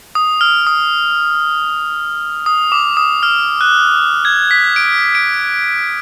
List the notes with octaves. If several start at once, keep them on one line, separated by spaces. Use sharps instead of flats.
D#6
F6
D#6
D#6
D6
D#6
F6
F#6
G#6
B6
D7
D7